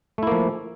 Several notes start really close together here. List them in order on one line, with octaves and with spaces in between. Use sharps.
A3 E4 A#3 F3